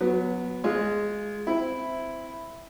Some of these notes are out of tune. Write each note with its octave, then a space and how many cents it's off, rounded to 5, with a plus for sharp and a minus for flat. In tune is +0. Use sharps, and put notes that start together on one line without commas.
F#3 -25 B3 +0
G#3 +0 F4 -15
C4 -15 E4 +0